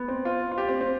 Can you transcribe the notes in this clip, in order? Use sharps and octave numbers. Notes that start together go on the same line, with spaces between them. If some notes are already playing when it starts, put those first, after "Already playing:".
Already playing: B3
C4
F4
F4
G4
C4
C4